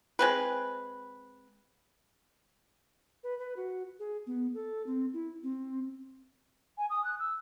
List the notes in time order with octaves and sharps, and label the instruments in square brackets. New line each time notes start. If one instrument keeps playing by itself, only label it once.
[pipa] G#3 C4 B4
[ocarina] B4
B4
F#4
G#4
B3
A4
C4
E4
C4
[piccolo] G#5
D#6
F#6
E6